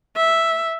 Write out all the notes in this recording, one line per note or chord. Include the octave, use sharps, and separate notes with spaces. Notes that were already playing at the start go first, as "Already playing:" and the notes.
E5